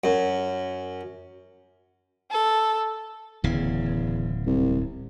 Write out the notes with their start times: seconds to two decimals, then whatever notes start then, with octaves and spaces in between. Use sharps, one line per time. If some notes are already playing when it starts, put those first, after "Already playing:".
0.04 F#2
2.30 A4
3.44 D1 E2 C#3
4.46 C2